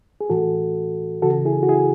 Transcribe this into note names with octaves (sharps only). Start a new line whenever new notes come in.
G#4
A2 E3 F#4 A4
C#3 E3 F#4 A4
E4 G#4
F#4
E4 G#4